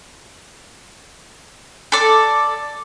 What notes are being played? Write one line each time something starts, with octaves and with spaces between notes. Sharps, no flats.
A4 D5